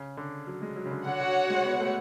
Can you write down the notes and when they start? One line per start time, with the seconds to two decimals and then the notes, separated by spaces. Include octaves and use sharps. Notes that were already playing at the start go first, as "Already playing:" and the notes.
Already playing: C#3
0.17 D3
0.47 F#3
0.62 G#3
0.76 F#3
0.86 C#3
0.91 D3
1.06 D3 F#4 C#5 F#5
1.21 D3
1.50 G#3
1.65 B3
1.80 A3